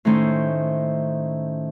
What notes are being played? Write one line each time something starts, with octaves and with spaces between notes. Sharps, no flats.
A2 D#3 A3 C#4 D#4 C5